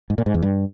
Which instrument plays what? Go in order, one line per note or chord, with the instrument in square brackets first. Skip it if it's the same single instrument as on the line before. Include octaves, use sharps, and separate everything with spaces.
[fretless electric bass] G#2
A#2
G#2
E2
G2